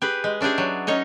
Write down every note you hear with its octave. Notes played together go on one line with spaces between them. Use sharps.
G4 G#4 B4
G#3
C#4 D4 E4 G4 G#4
F#3
C#4 D#4 C#5 D#5